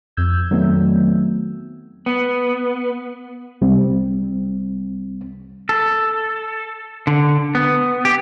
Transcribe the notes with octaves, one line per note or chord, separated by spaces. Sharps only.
F2 E6 G6 G#6
D#3 F#3 A3 B3 C4
B3
C2 G3 C4
A4
D3
B3
G4